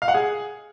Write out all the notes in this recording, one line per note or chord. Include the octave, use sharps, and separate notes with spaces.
F5
F#5
G#4